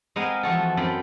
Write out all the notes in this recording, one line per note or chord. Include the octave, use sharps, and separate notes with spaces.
G#3 B3 C4 A#4 F5 G#5
E3 F3 F#4 A4
F#2 C4 C5 B5